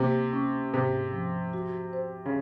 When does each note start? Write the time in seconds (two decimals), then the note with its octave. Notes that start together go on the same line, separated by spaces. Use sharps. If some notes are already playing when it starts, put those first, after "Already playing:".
Already playing: C3 A#3
0.33 C#4
0.73 G#2 C3
1.13 F3
1.53 F#4
1.93 C5
2.26 C#3